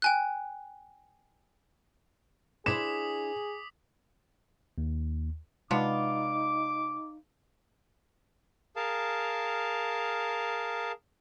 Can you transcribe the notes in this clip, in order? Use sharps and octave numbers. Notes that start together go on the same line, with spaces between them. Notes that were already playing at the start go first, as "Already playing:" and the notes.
G5 G#5 F#6
D4 E4 G#4 C5 D6 D#6 B6 E7
D#2
C3 G#3 B3 D4 D#4 F4 D6
G#4 A#4 F5 A5